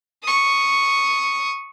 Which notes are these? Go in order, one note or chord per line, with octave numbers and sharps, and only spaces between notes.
C#6 D#6